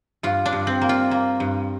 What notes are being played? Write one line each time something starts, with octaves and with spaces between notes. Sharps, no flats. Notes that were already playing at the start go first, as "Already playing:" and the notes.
G2 F4
D4
G2
C4
A#3
F4
A#3
G2